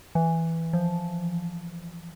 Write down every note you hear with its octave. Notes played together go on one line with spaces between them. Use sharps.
E3
F3